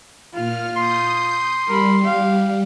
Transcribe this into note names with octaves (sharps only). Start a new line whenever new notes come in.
A#2 F4 F6
C6 D#6 G6
G3 A#4 B5
G4 F5